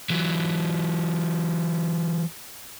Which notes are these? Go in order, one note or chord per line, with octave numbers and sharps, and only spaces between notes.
E3 F#3